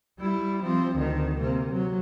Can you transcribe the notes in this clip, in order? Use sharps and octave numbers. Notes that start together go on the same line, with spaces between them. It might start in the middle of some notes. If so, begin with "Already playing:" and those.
G3 E4
F3 C4
D2 D#3
C3 A#3
F#3